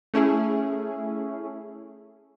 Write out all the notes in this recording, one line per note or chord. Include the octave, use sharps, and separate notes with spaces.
A3 C#4 E4 G#4